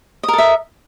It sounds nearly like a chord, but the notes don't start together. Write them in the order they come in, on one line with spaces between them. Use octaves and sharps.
D#5 A#4 A4 E5